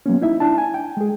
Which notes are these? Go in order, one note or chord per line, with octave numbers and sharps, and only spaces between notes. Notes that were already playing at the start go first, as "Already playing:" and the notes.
F#3 A#3 B3 C#4
D#4 E4 E5
D4 E4 A5
G#5
G5
G#3 G#4